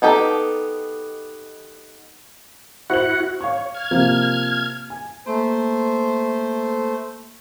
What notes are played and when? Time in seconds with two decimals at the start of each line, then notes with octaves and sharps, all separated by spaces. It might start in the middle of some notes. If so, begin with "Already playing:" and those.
0.02 B3 D#4 G4 A4
2.90 E4 F#4 C5 F#5 F#7
3.41 C#5 F5 C#6
3.75 F6 G#6
3.91 C3 F3 A#3
4.90 G#5
5.26 A3 A#3 C5